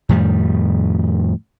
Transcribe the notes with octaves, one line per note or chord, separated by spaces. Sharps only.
F2 A2 D#3 G3